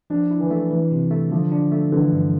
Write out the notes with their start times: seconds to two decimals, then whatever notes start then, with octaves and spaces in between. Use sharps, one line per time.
0.10 F3 D4
0.31 E4
0.40 E3
0.51 A3
0.71 E3
0.92 C3
1.11 A3
1.31 D3 F3
1.52 D4
1.72 A3
1.92 D3 E3
2.12 G2